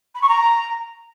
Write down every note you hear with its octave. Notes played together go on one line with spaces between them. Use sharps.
B5
C#6
A#5